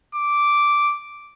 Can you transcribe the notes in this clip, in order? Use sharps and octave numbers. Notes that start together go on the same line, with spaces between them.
D6